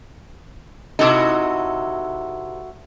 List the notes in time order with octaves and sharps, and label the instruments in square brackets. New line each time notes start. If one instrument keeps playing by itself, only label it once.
[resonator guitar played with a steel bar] C3 D#4 [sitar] E4 F#4 A4